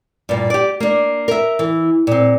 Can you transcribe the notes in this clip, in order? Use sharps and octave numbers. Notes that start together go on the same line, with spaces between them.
G2 A#2
G4 D5
A#3 D4
A#4 E5
E3
A#2 C4